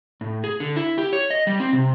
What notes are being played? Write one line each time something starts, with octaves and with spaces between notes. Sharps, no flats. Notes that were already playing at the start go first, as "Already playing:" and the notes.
A2
G#4
D3
E4
G4
C#5
D#5
G3
C4
C3